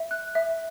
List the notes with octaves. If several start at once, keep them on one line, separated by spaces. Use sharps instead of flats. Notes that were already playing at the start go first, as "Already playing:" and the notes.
Already playing: E5
F#6
E5